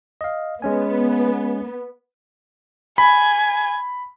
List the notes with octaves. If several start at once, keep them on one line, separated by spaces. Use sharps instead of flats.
D#5 F5
G#3 B3 C#4 G#5
G#5 B5